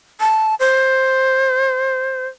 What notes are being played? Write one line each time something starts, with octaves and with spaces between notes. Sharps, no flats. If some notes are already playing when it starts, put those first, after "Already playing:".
A5
C5